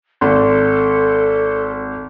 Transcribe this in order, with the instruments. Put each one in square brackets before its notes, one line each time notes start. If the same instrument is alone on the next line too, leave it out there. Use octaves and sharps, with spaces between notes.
[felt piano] G#1 [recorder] A4